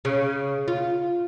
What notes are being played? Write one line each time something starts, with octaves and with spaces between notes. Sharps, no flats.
C#3
F4